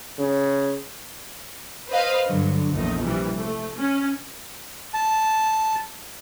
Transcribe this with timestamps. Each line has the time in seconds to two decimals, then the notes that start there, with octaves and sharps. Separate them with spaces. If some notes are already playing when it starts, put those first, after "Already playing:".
0.18 C#3
1.90 B4 C5 D#5 F5
2.27 G2 D3 F#3
2.72 A#1 E2 A3 D#4
3.05 C3 E3 G3
3.37 A3
3.78 C#4
4.94 A5